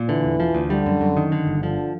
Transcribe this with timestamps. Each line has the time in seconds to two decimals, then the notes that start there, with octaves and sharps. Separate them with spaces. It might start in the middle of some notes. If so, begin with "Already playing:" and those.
Already playing: A#2
0.08 D3 E3
0.24 E1
0.40 F3
0.55 D2
0.70 D3 G3
0.86 F#2
1.01 F#2
1.17 D#3
1.32 D3
1.47 G1
1.63 D3 F3